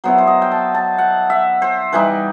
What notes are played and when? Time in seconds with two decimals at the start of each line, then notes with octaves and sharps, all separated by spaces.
0.04 F#3 B3 E4 C5
0.18 C5
0.27 D#5
0.42 G5
0.51 A5
0.75 A5
0.98 F#5
1.30 E5
1.62 C5
1.93 E3 G3 D#4 B4